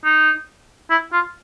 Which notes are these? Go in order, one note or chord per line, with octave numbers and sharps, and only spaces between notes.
D#4
E4
F4